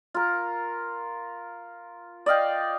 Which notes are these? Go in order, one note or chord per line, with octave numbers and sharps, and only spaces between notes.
F4 A#4
D5 D#5 F5 G5